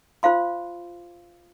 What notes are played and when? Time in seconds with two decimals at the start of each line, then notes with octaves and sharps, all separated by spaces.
0.23 F4 C5 F5 C6